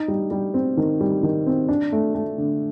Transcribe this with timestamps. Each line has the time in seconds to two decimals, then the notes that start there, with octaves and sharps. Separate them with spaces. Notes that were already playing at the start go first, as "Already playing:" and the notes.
Already playing: D#4
0.08 G3
0.31 G3
0.54 C4
0.77 D#3
1.01 G3
1.23 D#3
1.47 C4
1.69 D4
1.92 A3
2.15 A3
2.38 D3